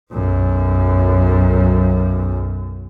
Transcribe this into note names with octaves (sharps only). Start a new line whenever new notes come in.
B1 F#2